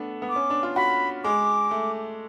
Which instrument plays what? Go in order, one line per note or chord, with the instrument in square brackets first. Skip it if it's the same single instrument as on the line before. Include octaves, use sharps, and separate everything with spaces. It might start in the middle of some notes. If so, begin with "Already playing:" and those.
Already playing: [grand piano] A3 B3 D4
B3
[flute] D6
[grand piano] C#4
D4
F4
[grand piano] F#4 [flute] B5
[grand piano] G#3 [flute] D6
[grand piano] A3